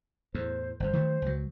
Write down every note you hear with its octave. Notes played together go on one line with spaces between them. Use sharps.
E2 A2 C5
G1 F2 C5
D#3 F#3 A3
C#2 F#3